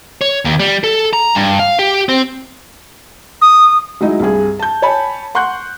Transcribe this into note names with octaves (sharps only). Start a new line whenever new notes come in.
C#5
D#2
G3
A4
A#5
G2
F5
G4
C4
D#6
F#3 G#3 D#4 E4
C2 G2 G#4
A5 G6
C#5 G#5 A5 B5
F#5 C6 C#6 F#6 G6